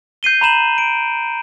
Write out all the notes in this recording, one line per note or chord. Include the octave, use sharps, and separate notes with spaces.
G6 C7 D#7 G7
A#5 B5 E7 F#7
D7